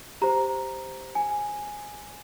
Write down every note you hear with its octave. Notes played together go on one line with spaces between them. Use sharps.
G4 C5 A#5
G#5